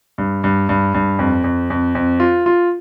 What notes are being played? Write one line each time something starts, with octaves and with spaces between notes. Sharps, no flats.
G2
G2
G2
G2
F2
F2
F2
F2
F4
F4